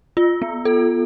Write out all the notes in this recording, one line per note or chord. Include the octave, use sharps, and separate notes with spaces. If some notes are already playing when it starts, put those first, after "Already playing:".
F4
B3
A4